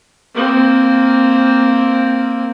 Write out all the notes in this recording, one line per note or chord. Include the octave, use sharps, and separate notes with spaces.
A#3 C4